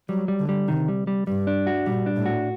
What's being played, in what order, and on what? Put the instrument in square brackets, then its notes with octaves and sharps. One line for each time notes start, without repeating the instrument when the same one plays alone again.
[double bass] F#3 [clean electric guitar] G3
[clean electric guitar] G3
[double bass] D3
[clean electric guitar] G3
[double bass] C3 [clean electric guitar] D#3
[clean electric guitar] G3
G3
[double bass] G2 [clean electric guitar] G3
[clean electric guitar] D4
F#4
[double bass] A#2 [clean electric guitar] G3
[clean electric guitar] D4
[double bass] A2
[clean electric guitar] F#4